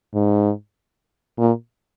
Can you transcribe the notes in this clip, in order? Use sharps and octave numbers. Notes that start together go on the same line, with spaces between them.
G#2
A#2